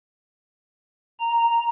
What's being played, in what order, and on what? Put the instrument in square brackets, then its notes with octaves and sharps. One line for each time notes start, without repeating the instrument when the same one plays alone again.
[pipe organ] A#5